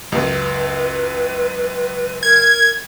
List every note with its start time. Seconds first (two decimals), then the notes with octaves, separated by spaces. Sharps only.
0.12 C#2 F#2 B4
2.23 A#4 G#6